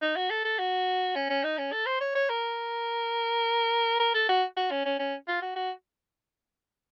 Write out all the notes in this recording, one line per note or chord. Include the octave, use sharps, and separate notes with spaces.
D#4
F#4
A4
A4
F#4
C#4
C#4
D#4
C#4
A4
C5
C#5
C#5
A#4
A#4
A4
F#4
F#4
C#4
C#4
C#4
F4
F#4
F#4